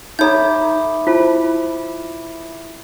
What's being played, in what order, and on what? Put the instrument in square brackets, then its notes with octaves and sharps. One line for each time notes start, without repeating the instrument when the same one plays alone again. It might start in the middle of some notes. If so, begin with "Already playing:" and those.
[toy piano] D#4 A4 A#5 [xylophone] C#5 G6 [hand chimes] E5 B5 D6
[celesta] E4 [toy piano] F4 C5 A5